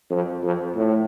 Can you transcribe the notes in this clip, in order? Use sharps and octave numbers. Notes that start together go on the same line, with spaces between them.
F2
F2
A2